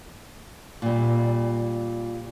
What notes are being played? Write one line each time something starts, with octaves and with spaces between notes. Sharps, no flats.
A#2 G3